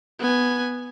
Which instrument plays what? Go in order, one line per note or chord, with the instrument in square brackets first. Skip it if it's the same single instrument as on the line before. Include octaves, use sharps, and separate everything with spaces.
[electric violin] B3 G#5